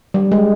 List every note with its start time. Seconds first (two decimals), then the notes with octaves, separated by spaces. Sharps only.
0.14 G3
0.32 G#3